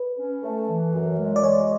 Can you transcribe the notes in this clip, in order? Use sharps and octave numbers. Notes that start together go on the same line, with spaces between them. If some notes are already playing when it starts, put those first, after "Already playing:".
Already playing: B4
C#4
A3
E3
F#2
G#3
D5
G#3 C#5